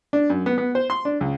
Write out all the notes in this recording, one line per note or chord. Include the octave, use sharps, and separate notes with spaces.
D4
F#2
B3
B3
C5
C6
D4
C#2